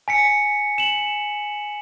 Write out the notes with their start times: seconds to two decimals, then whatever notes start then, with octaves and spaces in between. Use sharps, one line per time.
0.08 G#5 B6 C#7
0.78 E7 F#7